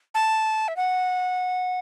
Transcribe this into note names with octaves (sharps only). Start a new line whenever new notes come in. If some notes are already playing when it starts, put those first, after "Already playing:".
A5
E5
F#5